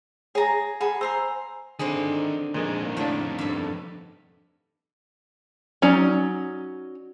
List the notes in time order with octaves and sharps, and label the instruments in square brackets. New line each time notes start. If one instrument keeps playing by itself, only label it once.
[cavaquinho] G#4 A#5 [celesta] C#5 G#5
[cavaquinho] G#4 A4 B5 [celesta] F#5
[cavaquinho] C5 A#5 C6 [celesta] G#5 E6
[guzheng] D3 C4 D#4 [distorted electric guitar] D#3 B5 [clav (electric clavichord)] G#4
[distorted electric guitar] F2 D#3 [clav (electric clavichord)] A#2 G#3
[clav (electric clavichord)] A2 D4 [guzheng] C#3 A#3 B3
[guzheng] G2 A4
[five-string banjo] F#3 C#4 D#4 D5